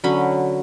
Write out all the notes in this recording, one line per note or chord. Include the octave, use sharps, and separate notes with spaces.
D3 F#3 C#4 B5